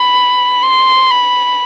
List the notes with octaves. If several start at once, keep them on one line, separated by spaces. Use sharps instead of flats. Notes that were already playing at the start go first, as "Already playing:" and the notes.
Already playing: B5
C6
B5